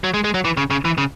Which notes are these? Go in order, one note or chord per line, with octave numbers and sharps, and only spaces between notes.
F#3
G#3
G#3
F#3
E3
C#3
C#3
E3
C#3